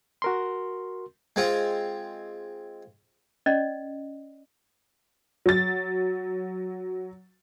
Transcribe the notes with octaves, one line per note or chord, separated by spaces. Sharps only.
F#4 A#4 C6
G#3 C4 F4
C#4 D5 D#5
F#3 A6